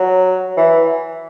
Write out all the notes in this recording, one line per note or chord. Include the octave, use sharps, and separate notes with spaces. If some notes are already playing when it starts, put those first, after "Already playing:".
Already playing: F#3
E3